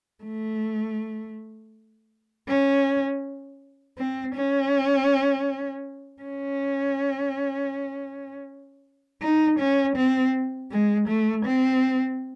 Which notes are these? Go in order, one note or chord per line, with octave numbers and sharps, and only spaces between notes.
A3
C#4
C4
C#4
C#4
D#4
C#4
C4
G#3
A3
C4